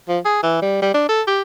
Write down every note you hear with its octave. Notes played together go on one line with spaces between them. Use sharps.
F3
G#4
E3
G3
G3
D4
A4
G4